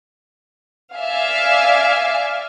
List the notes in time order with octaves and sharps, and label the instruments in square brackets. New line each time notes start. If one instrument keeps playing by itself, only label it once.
[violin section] D5 E5 F5 G#5